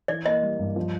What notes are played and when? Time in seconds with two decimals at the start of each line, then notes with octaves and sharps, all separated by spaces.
0.08 E3 D5
0.26 A#3 D#5
0.43 G3
0.59 G2
0.76 F3